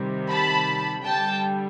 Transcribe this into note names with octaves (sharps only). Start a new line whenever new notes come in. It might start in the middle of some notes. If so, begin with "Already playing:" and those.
Already playing: C3 D#3 G3
A5 B5
D3 G3 G5 A5